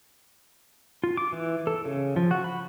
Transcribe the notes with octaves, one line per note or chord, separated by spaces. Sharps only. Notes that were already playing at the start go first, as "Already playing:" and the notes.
F4
D6
E3
A4
C#3
F3
F#4
B5